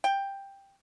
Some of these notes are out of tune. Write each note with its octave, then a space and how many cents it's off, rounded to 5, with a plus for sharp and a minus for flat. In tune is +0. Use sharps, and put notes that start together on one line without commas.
G5 +10